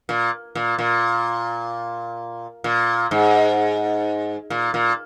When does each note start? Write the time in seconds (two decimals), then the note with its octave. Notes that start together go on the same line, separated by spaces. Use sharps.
0.09 A#2
0.55 A#2
0.79 A#2
2.64 A#2
3.11 G#2
4.50 A#2
4.74 A#2